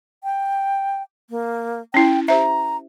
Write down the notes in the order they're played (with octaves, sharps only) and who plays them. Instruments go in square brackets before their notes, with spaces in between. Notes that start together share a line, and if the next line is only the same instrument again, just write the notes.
[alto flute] G5
A#3
[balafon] C#4 E4 [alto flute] G5
[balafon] G4 C5 E5 [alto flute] A#5